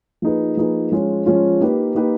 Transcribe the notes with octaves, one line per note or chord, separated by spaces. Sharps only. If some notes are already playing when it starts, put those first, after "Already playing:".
F3 A#3 D#4 G#4 B4
F3 A#3 D#4 G#4 B4
F3 G#3 C#4 F4
F3 G#3 C#4 F4
A#3 D#4 G4 B4
A#3 D#4 G4 B4